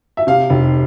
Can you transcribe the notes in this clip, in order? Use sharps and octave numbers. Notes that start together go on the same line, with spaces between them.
E5
C3 F5
F1